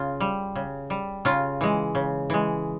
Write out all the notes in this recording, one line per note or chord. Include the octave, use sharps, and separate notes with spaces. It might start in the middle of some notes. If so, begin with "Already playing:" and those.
Already playing: C#3 F4
G3
C#3
G3
C#3 F4
E3 G#3
C#3
E3 G#3